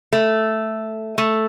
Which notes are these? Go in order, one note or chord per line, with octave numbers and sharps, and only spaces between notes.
A3
A3